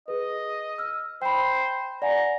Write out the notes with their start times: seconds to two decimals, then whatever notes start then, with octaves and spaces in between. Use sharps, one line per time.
0.08 G#4 B4 D#5
0.78 E6 F6
1.22 C5 G5 B5
2.02 D5 F#5 G#5 A#5